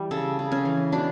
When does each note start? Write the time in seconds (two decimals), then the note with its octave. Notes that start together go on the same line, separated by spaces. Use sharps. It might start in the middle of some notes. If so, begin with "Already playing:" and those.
Already playing: E3 G3 G4
0.11 C#3 A4
0.39 C#3
0.52 C#4
0.65 E3
0.92 B2 D4